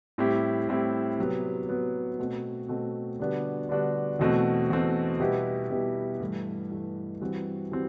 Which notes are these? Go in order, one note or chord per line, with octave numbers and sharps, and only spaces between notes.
A2 G3 C4 E4 G4
A2 G3 C4 E4 G4
C3 F#3 B3
C3 F#3 B3
B2 A3 C4 F#4
B2 A3 C4 F#4
D3 G3 B3 D4 F#4
D3 G3 B3 D4 F#4
E2 B2 A3 C4 F#4
E2 B2 A3 C4 F#4
B2 G3 B3 E4 G4
B2 G3 B3 E4 G4
G2 E3 A3
G2 E3 A3
G2 E3 G3 C4 F#4
E3 G3 C4 F#4